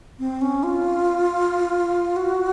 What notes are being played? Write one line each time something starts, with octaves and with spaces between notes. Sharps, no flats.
C4
C#4
F4
F#4